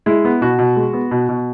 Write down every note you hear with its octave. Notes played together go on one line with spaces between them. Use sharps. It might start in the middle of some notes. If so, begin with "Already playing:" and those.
G#3 E4
B3
B2 F#4
B2
G#3
B3
B2
B2